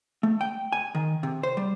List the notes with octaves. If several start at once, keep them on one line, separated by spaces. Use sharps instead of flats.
A3
G5
G#5
D#3
C3
C5
G3